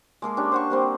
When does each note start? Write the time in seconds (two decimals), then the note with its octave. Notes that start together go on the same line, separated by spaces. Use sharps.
0.22 G#3 A#3 A4
0.37 C#4 D4 G4
0.52 C5 F#5 C#6
0.70 G3 A#3 C4